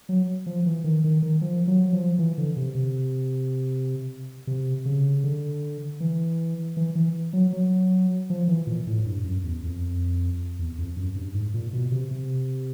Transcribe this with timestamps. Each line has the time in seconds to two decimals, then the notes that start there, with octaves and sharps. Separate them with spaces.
0.09 F#3
0.46 F3
0.66 E3
0.84 D#3
1.04 D#3
1.22 D#3
1.41 F3
1.67 F#3
1.93 F3
2.19 E3
2.38 D3
2.57 C3
2.75 C3
4.47 C3
4.85 C#3
5.24 D3
6.00 E3
6.77 E3
6.95 E3
7.33 F#3
7.53 F#3
8.30 F3
8.48 E3
8.67 A#2
8.87 A2
9.05 G2
9.24 F#2
9.44 E2
9.63 F2
10.59 E2
10.78 F2
10.97 F#2
11.16 G2
11.34 G#2
11.54 A#2
11.73 B2
11.92 C3
12.11 C3